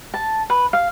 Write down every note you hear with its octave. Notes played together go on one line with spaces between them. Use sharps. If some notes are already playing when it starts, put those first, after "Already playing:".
A5
B4
F5